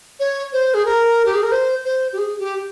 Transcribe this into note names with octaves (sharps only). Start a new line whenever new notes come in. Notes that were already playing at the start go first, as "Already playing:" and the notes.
C#5
C5
G#4
A#4
G4
G#4
A#4
C5
C5
G4
G#4
G4